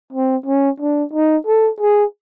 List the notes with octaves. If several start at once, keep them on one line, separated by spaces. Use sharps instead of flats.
C4
C#4
D4
D#4
A4
G#4